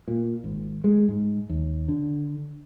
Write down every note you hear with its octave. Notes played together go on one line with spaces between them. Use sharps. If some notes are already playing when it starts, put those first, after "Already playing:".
A#2
G#1
G#3
G#2
D#2
D3